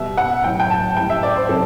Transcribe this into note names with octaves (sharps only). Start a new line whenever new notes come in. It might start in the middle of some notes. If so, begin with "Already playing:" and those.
Already playing: B2 G3 E5
F#5
A2 F#3 G5
G5
A5
A2 G3 G5
E5
D5
C5
C3 F#3 A4